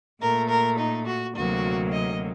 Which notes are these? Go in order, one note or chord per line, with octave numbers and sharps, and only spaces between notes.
A#2 A3 A#4
A#4
D#4
F#4
D2 C3 F#3 A#3 F#4
D#5